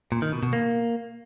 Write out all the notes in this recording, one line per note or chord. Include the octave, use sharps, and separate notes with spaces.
A#2
D#3
B2
B2
A#3